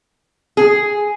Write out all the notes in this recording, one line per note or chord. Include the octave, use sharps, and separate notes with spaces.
G#4